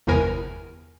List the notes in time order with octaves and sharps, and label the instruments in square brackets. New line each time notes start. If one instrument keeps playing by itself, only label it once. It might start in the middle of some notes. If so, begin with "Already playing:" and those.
[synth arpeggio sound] G1 E2 C3 B3 A#4 G#5